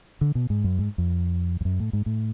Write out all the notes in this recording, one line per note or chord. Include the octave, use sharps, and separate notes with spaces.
D3
B2
G#2
F#2
G#2
F2
F2
F#2
A2
G#2
A2